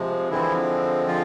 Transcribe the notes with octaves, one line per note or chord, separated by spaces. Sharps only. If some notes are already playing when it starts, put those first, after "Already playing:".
Already playing: C3 F3 G#3
D3 E3 F3 G#3 C4 E4
F3 F4